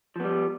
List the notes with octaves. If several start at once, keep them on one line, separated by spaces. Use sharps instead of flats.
F3 G3 B3